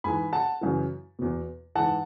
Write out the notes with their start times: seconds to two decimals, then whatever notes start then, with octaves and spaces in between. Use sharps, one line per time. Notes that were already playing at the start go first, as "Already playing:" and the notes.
0.04 G#2 E3 G#5 B5
0.33 F#5 A5
0.61 F#2 C#3 E3
1.19 E2 B2
1.75 G#2 E3 F#5 A5